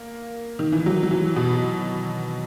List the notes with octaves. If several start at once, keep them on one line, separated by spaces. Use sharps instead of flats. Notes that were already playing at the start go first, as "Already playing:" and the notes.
Already playing: A#3
D#3
E3
F#3
F#3
E3
B2